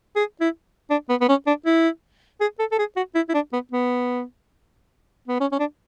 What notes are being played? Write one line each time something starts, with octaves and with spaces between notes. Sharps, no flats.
G#4
E4
D4
B3
B3
C#4
D4
E4
G#4
A4
A4
G#4
F#4
E4
E4
D4
B3
B3
B3
C#4
C#4
D4